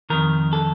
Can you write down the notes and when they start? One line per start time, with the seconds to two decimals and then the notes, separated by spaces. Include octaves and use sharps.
0.10 F2 D#3 A#4
0.53 A4